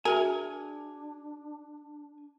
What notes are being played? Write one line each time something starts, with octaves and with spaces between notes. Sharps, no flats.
D4 F#4 G#4 A#4 E5 G#5